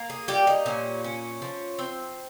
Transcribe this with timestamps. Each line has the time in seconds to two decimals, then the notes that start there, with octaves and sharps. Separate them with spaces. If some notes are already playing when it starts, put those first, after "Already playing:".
Already playing: A#3
0.10 G#4
0.28 G3 G4
0.47 D#4
0.66 A#2 C#4
1.04 C#4
1.42 F3
1.79 C4